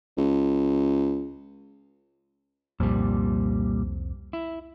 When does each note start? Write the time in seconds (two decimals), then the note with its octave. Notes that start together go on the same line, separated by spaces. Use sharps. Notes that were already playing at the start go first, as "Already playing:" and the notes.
0.17 C#2
2.80 C2 F2 A#2 G3
4.33 E4